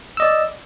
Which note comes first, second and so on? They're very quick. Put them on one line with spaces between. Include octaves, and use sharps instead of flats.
E6 D#5 D5